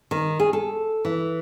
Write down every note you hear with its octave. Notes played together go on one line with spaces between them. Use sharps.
D#3
G#4
A4
E3